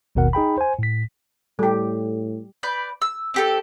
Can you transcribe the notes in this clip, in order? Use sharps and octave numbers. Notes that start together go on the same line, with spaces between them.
G#1 D#2 B2 D#3 A#4 F#5
D#4 G#4 G5 B5
C5 G#5
A2 B6
A2 G3 G4 A4
B4 D5 G6
E6
C4 G4 A4